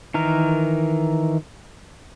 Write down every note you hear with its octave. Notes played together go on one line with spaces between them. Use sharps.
D#3 E3 A#4